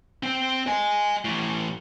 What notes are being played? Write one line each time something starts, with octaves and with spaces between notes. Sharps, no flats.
C4 C5
D#5 G#5
A2 E3